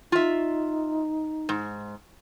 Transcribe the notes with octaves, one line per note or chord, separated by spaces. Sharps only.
D#4 F4 E5
G#2